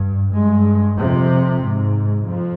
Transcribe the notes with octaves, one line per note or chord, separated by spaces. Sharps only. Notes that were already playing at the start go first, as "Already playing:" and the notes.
Already playing: G2
G2 G#3
F2 C3
G#2
F2 F3